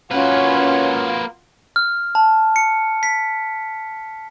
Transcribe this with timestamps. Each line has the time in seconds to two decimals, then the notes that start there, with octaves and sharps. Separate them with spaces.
0.11 A#3 C#4 F4 F#4 B4
1.76 F6
2.15 A5
2.56 C#7
3.03 B6